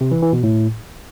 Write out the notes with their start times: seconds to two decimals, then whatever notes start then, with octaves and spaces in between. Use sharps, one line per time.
0.01 C3
0.12 E3
0.22 E3
0.33 B2
0.43 A2